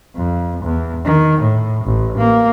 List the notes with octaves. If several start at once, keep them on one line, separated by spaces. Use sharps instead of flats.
F2
E2
D#3
A2
A1
A#3